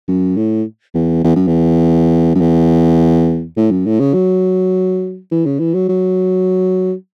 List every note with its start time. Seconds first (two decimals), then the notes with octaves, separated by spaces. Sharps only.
0.08 F#2
0.37 A2
0.95 E2
1.24 E2
1.36 F#2
1.47 E2
2.35 F#2
2.41 E2
3.57 A2
3.71 F#2
3.86 A2
4.00 C#3
4.14 F#3
5.31 E3
5.46 C#3
5.59 E3
5.74 F#3
5.89 F#3